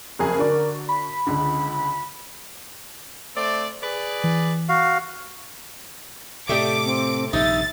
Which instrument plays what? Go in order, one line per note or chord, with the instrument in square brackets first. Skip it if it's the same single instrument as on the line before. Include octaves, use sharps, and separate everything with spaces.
[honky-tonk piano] F#1 F2 G#4 [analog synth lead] A#4
[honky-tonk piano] D3 F#4 D5
[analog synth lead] B5
[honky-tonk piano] C#2 D3
[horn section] A3 C4 D5
G#4 B4 D5
[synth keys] E3
[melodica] F#4 F5
[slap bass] A2 C3 [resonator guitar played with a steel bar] A3 G4 D#5 [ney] D5 [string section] D6
[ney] C4
[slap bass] A#1 G2 C3 [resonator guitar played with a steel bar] D#4 [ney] E5 [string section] A6